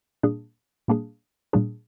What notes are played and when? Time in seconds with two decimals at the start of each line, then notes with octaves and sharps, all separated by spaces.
0.23 A#2 G3 A#3 D4 G#4
0.88 A#2 G3 A#3 D4 G#4
1.53 A#2 G3 A#3 D4 G#4